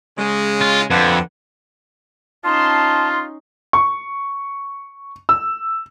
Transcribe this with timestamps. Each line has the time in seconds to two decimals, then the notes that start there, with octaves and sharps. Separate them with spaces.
0.18 C#3 G#3
0.61 F4
0.90 F2 D3 B4 F#5
2.45 C#4 D#4 F4 A5 C6
3.73 C#6
5.29 E6